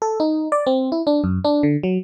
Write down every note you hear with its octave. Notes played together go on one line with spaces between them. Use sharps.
A4
D#4
D5
C4
E4
D4
F#2
D4
D3
F#3